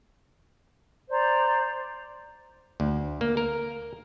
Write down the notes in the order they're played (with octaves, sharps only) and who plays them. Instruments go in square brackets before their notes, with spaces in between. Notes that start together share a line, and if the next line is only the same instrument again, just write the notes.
[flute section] C5 D5 A#5
[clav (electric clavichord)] D2
A#3
A#4